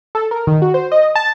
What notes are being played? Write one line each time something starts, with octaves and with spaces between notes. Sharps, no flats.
A4
A#4
D#3
F#4
C5
D#5
A5